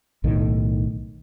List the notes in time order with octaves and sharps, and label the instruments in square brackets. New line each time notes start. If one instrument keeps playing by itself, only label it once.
[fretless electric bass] B1 A2 D#3